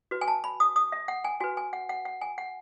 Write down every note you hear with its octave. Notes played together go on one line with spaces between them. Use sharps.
F#4 B4
G#5
A5
B5
D#6
D#6
E5
F#5
G#5
F#4 B4 G#5
G#5
F#5
F#5
F#5
G#5
F#5